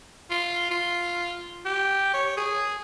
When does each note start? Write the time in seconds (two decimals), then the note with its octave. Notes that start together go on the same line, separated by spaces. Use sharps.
0.30 F4
0.71 F4
1.65 G4
2.14 C#5
2.37 G#4